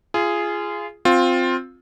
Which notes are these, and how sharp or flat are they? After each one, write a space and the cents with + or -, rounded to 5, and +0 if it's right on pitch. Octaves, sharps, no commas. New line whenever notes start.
F4 -25 G#4 +0
C4 +0 F4 +15